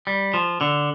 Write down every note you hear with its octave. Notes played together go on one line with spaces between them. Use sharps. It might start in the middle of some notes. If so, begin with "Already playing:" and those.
G3
F3
D3